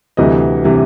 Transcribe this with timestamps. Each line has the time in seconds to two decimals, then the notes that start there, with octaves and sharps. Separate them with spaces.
0.17 D2 C3 E3 G3 D#5
0.64 C3 E3 G3